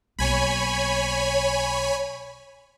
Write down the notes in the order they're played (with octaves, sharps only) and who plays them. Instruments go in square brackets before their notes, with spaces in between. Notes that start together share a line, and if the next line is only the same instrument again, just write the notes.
[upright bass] B1 A#3 [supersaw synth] C#5 G#5 B5